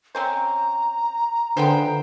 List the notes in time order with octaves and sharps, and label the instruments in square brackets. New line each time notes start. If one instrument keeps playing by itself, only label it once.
[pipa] C4 C#4 C5 [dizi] A#5
[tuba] D3 [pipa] F3 G#3 B3 [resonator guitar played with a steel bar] C5 G5